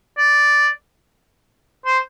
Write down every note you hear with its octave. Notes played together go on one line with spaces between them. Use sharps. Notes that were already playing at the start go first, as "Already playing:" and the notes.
D5
C5